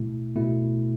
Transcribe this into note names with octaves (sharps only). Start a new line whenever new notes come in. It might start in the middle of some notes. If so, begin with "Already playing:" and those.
Already playing: B2 A3 E4
B2 A3 E4